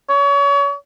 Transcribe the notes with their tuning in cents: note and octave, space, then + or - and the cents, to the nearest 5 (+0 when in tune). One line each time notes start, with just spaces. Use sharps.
C#5 +35